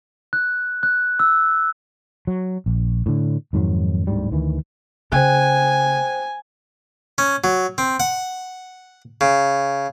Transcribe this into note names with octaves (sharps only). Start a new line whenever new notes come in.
F#6
F#6
E6
F#3
A#1
A2 D3
F2 G#2 D#3 F#3
D1 D2 G#2 G3
D2 D#3 E3
C#3 C5 G5 G#5 F#6
C#4
F#3
C4
F#5
C#3